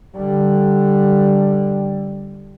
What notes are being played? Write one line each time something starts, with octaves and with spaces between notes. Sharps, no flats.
D3 G3